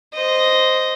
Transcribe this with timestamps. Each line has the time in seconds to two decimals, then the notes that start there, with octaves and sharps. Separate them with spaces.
0.14 C5 D#5